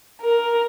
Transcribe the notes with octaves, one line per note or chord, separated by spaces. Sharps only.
A#4